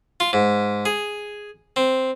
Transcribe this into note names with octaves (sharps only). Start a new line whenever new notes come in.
F4
G#2
G#4
C4